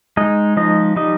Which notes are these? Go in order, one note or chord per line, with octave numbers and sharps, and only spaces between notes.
G#3 D#4 D#5
F3 D#4 D#5
G3 D#4 D#5